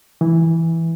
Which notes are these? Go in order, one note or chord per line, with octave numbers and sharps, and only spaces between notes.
E3